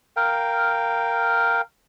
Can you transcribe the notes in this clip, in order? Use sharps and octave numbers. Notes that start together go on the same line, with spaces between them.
A#4 F5 G5